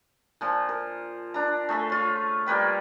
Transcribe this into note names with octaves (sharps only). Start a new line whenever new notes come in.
A#2 F3 F4
A#4
D4 A#5
A3 G#4 A4 B5
F4 C#5
G3 A#3 B4 G5